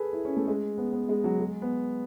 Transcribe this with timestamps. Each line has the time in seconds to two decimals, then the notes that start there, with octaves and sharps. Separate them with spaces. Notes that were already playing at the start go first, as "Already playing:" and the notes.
Already playing: G#4 A4 B4
0.13 E4
0.25 C#4
0.37 A3
0.48 G#3
0.78 B3
0.93 B3
1.09 G#3
1.24 F#3
1.40 G#3
1.62 B3